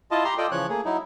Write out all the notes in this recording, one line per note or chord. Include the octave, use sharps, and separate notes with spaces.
E4 F4 D#5 A5
G4 A#5 C6
F4 A4 D5 D#5 G5
C#3 E3 F3 C#5 F#6
A3 A#3 G#4
F#3 D#4 E4